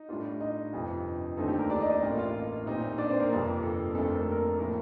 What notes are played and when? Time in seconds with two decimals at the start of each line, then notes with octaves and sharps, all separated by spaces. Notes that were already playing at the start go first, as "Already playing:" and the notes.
Already playing: D#4 D#5
0.09 A2 G3 D4 F4
0.40 D#4 D#5
0.73 G1 F2 C3 G3
1.37 D#2 D3 A3 C4 D#4 A4
1.48 G4
1.59 A#3 A#4
1.70 D4 D5
1.80 D#4 D#5
2.02 A1 A2 G3 A#3
2.18 F4 F5
2.66 A#2 G3 C4 D#4
2.98 D4 D5
3.09 C4 C5
3.20 A#3 A#4
3.31 G1 F2 C3
3.63 A4
3.95 F2 D3 F3 A3 C4 A4
4.11 A#4
4.21 A4
4.31 A#3 A#4
4.59 A2 F3 A#3 C4 A#4